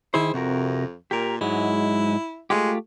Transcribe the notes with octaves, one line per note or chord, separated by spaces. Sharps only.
D#3 E4 G#4 C5
F2 C3 F#4 A#4
A#2 G4 A#4
G#2 F#3 G#3 E4
G#3 A3 F4 G4